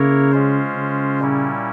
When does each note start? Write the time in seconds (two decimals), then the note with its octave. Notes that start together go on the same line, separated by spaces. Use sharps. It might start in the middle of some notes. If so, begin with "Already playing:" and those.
Already playing: C#3 A#3 E4 A#4 C#5
0.32 G#3 C#4 F4 C5
0.76 C#3
1.20 A#2 G3 C#4 E4